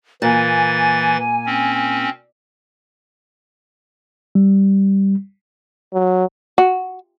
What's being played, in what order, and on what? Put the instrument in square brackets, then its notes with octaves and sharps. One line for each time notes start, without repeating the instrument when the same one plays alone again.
[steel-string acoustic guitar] A#2 [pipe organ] E3 A6 [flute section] G#5
[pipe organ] C4 C#4
[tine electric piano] G3
[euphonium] F#3
[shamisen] F#4